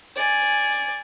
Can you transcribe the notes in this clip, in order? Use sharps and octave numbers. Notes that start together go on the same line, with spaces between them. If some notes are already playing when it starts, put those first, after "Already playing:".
D5 G#5